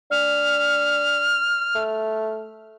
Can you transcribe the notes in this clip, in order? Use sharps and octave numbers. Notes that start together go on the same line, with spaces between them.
D4 F6
A3